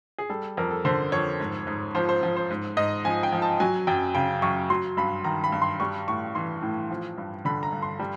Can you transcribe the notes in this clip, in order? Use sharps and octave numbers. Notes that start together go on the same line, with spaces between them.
G#4
G3 A4
F2 A#4
A4
D3 C5
F2 C#5
G#2
G#2
F3 C5
C5
F3
C5
G#2
G#2 D#5
F3 G#5
G5
F3
A5
F#3 G#5
F#2 G5
C#3 G5
F#2 C#6
F#3 C6
G2 B5
D#3 A#5
B5
G2
C6
G3 C#6
A2 C#6
E3 C6
A2
F3
G2
D3 B5
A#5
G2
C6
G3